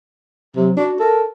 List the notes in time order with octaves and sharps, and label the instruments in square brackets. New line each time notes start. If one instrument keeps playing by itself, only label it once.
[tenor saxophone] C3 [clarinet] F#3
[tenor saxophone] D4 [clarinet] F#4
[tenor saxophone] A4 [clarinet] A#4